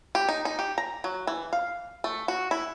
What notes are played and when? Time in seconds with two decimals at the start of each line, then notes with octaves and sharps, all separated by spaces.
0.15 G4
0.29 D#4
0.45 D#4
0.59 G4
0.78 A#5
1.04 F#3
1.27 E3
1.53 F5
2.04 A3
2.28 F#4
2.51 E4